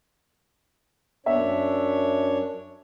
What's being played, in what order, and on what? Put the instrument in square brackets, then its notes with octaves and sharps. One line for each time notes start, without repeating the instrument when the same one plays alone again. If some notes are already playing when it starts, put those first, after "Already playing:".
[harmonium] F#2 D4 C#5 [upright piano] E5